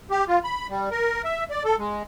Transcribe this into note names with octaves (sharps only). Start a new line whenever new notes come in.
G4
F4
B5
G3
A#4
E5
D5
A4
G#3